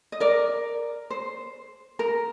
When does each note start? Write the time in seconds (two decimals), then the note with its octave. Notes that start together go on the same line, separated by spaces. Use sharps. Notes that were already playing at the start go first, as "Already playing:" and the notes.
0.12 D#5
0.20 A#4 D5
1.10 C5
1.99 A#4